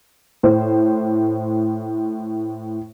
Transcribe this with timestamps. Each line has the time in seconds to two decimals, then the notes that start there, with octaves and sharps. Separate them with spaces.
0.43 A2 C5